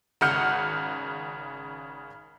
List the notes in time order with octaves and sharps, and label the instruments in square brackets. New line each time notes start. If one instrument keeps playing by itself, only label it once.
[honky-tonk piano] G#1 C#3 F#5 F6 G6 C#7